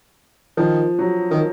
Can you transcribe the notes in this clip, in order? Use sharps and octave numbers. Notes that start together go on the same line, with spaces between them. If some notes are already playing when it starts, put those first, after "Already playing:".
D#3 F3
F#3
D#3